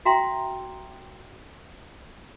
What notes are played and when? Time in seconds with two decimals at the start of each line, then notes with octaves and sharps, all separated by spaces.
0.05 F#4 E5 G5 A#5 C6